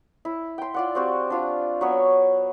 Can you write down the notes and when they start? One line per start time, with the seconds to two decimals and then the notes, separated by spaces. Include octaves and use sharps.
0.25 E4
0.58 G5 C6
0.74 F4 D5 F#5
0.95 C4 F#4 G4
1.30 D4 F4 F5
1.81 F#3 B3 C#5